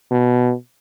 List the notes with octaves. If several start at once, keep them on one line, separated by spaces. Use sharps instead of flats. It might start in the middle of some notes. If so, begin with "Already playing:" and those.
B2